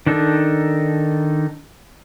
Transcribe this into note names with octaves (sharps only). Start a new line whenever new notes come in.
D#3 D4 D#4 A4